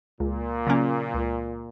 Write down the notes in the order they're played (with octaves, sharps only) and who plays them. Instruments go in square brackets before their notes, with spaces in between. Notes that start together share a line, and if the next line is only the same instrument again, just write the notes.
[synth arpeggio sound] C#2 [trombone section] A#2
[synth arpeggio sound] C#3 F#3 A#3 C#4
C#2